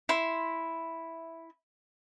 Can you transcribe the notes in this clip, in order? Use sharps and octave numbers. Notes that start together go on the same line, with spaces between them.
E4 C6